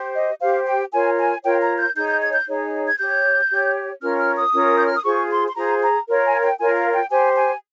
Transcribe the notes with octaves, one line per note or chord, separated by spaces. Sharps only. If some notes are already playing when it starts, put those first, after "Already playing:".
Already playing: G4 C5
D#5
G4 C5 F5
G5
F4 A#4 C#5 G#5
G#5
F4 A#4 C#5 G5
A#5
G6
D#4 G#4 C#5 G6
G6
G#6
G6
D#4 G#4 C#5
G#6
G4 C#5 G6
G4 C#5
C#4 F4 A#4 C#5 F6
F6
D#6
C#4 F4 A#4 C#5
G6
F6
D#6
F4 G#4 C5 C#6
C6
C6
F4 G#4 C5 A#5
A#5
F4 A#4 C#5
G#5
G5
F4 A#4 C#5 G#5
F5
G5
G4 C5 G#5
G#5